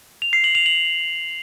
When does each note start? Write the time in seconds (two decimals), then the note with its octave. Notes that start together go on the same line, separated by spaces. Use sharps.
0.22 F7
0.33 C7
0.44 F#7
0.55 F7
0.66 F#7